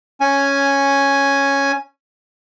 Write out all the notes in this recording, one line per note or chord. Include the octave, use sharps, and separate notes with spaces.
C#4 G#5